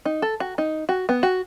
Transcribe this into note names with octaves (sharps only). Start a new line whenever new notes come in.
D#4
A4
F#4
D#4
F#4
B3
F#4